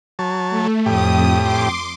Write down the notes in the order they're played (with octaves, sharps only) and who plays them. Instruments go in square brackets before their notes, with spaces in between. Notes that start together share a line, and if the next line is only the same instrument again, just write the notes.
[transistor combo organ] F#3 C#5 A5
[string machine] A3
[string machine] F2 D#6 [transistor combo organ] A2 G4
[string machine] C6 D6